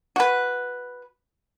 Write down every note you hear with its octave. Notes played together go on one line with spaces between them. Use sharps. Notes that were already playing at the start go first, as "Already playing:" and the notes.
F#4 B4